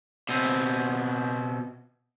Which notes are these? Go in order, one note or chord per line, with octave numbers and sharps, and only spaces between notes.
B2 C4